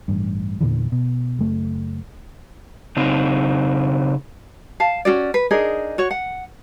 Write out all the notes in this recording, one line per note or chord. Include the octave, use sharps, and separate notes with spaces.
A1 G2
E2 A#2 D3 E3
B2
F#1 A3
C#3 C4 D#4
F5 A5
C#4 D#4 F#4 D5
B4
D4 D#4 G#4 A#4
F#4 C#5
F#5